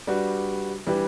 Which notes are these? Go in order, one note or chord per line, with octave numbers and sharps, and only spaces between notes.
G3 D4 F#4 B4
E3 G3 D4 G4 B4